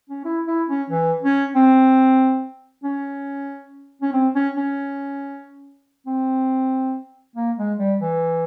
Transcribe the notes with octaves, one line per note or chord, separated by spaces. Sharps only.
C#4
E4
E4
C#4
E3
C#4
C4
C#4
C#4
C4
C#4
C#4
C4
A#3
G#3
G3
E3